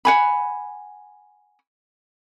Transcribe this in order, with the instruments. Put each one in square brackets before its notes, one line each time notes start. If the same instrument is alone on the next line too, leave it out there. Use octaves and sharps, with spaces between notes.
[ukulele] F#5 G#5 B5